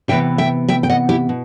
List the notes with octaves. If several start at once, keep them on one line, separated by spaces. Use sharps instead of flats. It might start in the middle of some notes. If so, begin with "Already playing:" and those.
C3 E3 B3 E5 G5
E5 G5
E5 G5
G5
D#5 F#5
E4 G4
B2